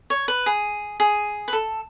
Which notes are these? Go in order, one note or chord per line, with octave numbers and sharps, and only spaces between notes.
C#5
B4
G#4
G#4
B4
A4